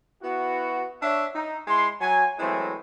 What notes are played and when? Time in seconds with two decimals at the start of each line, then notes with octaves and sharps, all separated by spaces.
0.22 B3 E4 F#4
1.02 D4 C#5 E5
1.34 D#4
1.67 G#3 E4 C6
2.01 F#3 G#5
2.39 E3 F#3 G#3 A3 C4